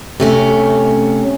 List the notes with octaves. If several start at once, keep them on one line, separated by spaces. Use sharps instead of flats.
C3 A3 C#4